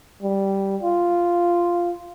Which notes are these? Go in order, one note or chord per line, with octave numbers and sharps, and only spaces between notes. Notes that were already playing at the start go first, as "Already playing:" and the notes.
G3
F4